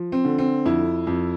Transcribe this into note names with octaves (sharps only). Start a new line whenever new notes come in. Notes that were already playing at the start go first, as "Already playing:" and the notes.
Already playing: F3
C4
D3
C4
F2 E4
F2